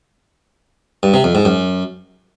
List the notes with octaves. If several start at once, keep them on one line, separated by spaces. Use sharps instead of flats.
G2
C3
F2
G#2
F#2